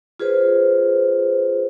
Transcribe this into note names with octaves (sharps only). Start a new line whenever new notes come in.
F4 G#4 B4 C5